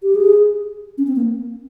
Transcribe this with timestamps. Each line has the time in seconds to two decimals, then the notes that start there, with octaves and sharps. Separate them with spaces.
0.03 G4
0.15 G#4
0.98 C#4
1.07 C4
1.16 A#3